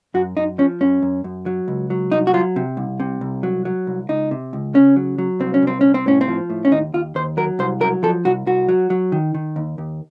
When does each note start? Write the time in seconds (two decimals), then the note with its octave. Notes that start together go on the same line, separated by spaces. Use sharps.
0.14 F#2 F#4
0.37 F#2 D#4
0.58 F3 C#4
0.81 F#2 C#4
1.02 F#2
1.24 F#2
1.46 F#3
1.68 C#2
1.90 F#3
2.12 C2 D#4
2.27 F#4
2.34 F#3 F4
2.56 C3
2.77 C2
3.00 C3
3.21 C2
3.43 F#3
3.65 F#3
3.87 C2
4.09 C#2 D#4
4.31 C3
4.53 C#2
4.74 C#3 C#4
4.96 F#3
5.18 F#3
5.40 C2 C4
5.54 C#4
5.62 C2 C4
5.81 C2 C#4
5.94 C4
6.06 A2 C#4
6.21 C4
6.28 F3
6.50 A2
6.65 C#4
6.72 D#2 D#4
6.94 D#2 F4
7.15 D#2 C5
7.37 F#3 A#4
7.59 C2 C5
7.81 F#3 A#4
8.03 F3 A4
8.25 C2 F#4
8.46 C2 F#4
8.69 F#3
8.90 F#3
9.12 D#3
9.35 D#3
9.56 D#2
9.78 D#2